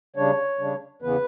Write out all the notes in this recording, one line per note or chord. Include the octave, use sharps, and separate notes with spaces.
C#3 G3 D4 C#5
C#3 G3 D4
E2 C#3 E3 B3 B4